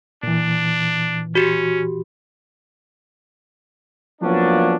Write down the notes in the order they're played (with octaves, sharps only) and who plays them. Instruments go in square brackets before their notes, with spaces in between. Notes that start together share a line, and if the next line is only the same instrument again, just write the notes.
[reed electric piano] A#2 E3 [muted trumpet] D4
[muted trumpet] C#4 [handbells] F#4 G4
[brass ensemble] F3 F#3 A#3 B3 C#4 D4